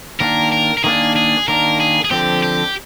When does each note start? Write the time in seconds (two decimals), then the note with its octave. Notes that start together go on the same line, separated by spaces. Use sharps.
0.20 D#3 A#3 D4 A#4
0.52 A#4
0.77 A#4
0.84 D#3 A#3 D4 G#4
1.16 G#4
1.48 D#3 A#3 D4 A#4
1.80 G#4
2.05 G#4
2.11 D3 F3 C4 G4
2.43 G4